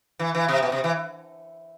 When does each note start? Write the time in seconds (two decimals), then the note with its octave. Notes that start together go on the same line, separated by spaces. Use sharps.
0.19 E3
0.35 E3
0.48 C3
0.63 B2
0.72 C3
0.84 E3